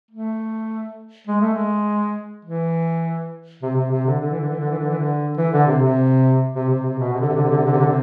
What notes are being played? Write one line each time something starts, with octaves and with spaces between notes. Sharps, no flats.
A3
G#3
A3
G#3
E3
C3
C3
C3
D3
D3
E3
D3
E3
D3
E3
D3
E3
D3
E3
D3
C3
C3
C3
C3
C3
B2
C3
D3
C3
D3
C3
D3
C3
D3
C3
D3
C3